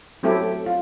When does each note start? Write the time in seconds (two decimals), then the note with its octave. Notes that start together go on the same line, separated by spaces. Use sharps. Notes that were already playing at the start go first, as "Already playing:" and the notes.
0.23 F#3 A3 C4 E4 G4 A4
0.66 F4